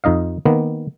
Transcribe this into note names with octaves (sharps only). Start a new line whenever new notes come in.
F2 D#4 D#5 F5
D#3 A#3 B3